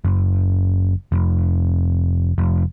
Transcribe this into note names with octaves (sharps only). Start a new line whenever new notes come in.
F#1
F1
F1